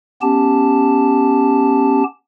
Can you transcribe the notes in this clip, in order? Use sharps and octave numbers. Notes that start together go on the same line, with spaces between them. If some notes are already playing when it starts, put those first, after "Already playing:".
B3 C#4 G4 A5